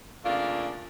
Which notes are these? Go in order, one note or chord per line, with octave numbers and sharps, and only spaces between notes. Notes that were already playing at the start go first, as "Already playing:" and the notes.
C#3 A3 A#3 D4 F4